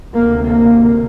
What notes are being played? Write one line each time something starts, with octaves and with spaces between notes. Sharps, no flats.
D2 C3 A#3
A#3